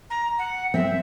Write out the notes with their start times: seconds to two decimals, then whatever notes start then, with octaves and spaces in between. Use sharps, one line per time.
0.10 A#5
0.38 F#5
0.74 C4 E5